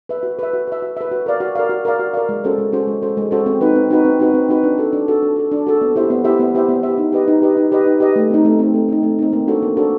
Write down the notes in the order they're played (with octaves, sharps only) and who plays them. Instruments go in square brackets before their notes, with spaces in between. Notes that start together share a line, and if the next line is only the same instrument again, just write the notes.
[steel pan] B4 E5
F#4
B4 E5
F#4
B4 E5
F#4
B4 E5
F#4
A#4 D5 F5
F#4
A#4 D5 F5
F#4
A#4 D5 F5
F#4
A#4 D5 F5
G#3
C#4 F#4 A4 C5
G#3
C#4 F#4 A4 C5
G#3
C#4 F#4 A4 C5
G#3
C#4 F#4 A4 C5
C4
D#4 F#4 B4
C4
D#4 F#4 B4
C4
D#4 F#4 B4
C4
D#4 F#4 B4
D4
F#4 A4
D4
F#4 A4
D4
F#4 A4
D4
F#4 A4
B3
E4 G4 C5 E5
B3
E4 G4 C5 E5
B3
E4 G4 C5 E5
B3
E4 G4 C5 E5
D#4
G4 B4 D#5
D#4
G4 B4 D#5
D#4
G4 B4 D#5
D#4
G4 B4 D#5
A3
C4 D#4
A3
C4 D#4
A3
C4 D#4
A3
C4 D#4
A#3
D4 F#4 A4 C5
A#3
D4 F#4 A4 C5